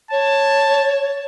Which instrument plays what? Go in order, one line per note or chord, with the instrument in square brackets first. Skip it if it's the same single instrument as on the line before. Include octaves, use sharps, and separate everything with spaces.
[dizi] C#5 [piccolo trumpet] A5